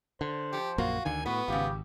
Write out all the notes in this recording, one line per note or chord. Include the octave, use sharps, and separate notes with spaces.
D3 C5
F3 G4
A#1 F#2 A#3 F4 F#4
D2 D3 D#3 G#5
A2 B3 F#4 B4
G#1 C#3 F4 G4